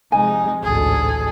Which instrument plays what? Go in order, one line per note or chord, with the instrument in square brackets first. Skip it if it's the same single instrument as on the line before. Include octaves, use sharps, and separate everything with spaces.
[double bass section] C3 F3 G#3 [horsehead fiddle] D#4 [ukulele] G#5
[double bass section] A1 D2 G#2 [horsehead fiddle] G#4 A4